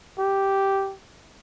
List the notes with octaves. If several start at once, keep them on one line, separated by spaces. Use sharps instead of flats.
G4